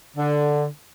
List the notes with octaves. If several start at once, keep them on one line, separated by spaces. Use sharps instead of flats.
D3